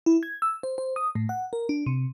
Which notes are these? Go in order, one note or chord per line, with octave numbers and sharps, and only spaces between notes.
E4
G#6
E6
C5
C5
D#6
A2
F#5
A#4
D4
C3